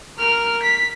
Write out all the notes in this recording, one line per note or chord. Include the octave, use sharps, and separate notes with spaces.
A#4 F6
B6